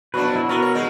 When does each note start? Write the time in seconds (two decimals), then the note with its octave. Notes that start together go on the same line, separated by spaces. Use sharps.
0.14 F2 B2 F#3 D4 B4
0.36 E4
0.49 B2 B3 A#4
0.62 C#5
0.74 F2 G#3 D#4